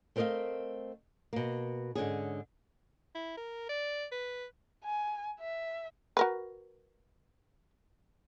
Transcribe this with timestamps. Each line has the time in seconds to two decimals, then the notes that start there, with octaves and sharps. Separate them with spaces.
0.16 A3 C4 A#4 C#5 D#5 F5
1.33 B2 A#3
1.95 G#2 D3 C#4 G#4
3.15 E4
3.37 A#4
3.69 D5
4.12 B4
4.84 G#5
5.40 E5
6.17 F#4 A#4 B4